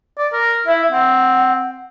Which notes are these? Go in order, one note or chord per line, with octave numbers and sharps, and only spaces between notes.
D5
A#4
E4 E5
C4 F#5